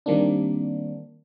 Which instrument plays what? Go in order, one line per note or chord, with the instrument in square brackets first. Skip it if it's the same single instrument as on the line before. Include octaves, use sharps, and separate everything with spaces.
[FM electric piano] D#3 G3 A#3 C4 D4